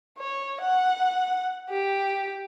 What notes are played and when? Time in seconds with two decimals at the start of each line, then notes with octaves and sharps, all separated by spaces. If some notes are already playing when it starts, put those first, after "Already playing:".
0.18 C#5
0.61 F#5
1.70 G4